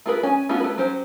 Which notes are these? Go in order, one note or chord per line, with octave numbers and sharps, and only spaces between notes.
A3 F4 G#4 A#4 B4
C#4 G#5
A3 B3 C#4 F4 F#4
A3 B4
F#3 C#4 G4 C5